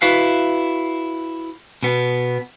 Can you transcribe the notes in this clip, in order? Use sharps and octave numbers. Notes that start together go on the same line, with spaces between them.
E4 F#4 B4 E5 F5
B2 B3